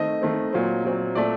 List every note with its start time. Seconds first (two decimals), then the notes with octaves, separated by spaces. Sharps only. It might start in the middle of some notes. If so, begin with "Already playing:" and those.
Already playing: D#3 A3 C4 D#5
0.22 D#3 A3 C4
0.53 A#2 F#3 C4
0.85 A#2 F#3 C4
1.15 A#2 A3 C4 D5